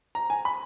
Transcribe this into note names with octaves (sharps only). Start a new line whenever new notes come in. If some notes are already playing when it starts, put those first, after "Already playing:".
A#5
G#5
B5